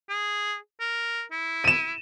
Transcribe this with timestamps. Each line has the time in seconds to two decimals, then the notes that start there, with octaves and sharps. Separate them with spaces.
0.09 G#4
0.80 A#4
1.32 E4
1.64 D#7 E7